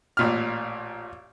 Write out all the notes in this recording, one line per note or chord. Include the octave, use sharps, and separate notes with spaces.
A1 A#2 F6